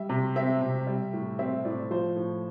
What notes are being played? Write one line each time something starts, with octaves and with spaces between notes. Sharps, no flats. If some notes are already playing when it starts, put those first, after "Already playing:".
Already playing: G3 E5
C3
C4 E5
C3
G3
A2
C4 E5
A2 D5
F3 C5
A2